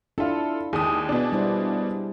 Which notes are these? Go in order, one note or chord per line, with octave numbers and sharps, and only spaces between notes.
D4 E4 F4 A4
D#2 G#4 D#6
B2 D4
G3 E4 C5